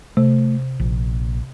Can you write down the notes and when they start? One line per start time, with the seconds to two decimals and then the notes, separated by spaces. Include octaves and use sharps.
0.17 C3 A3
0.80 A#1